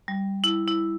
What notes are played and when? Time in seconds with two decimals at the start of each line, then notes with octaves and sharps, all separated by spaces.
0.08 G3
0.44 E4
0.67 E4